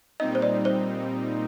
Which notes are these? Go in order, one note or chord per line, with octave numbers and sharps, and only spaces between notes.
A#2 G3 C4 D#4 D#5
C5
D5
C5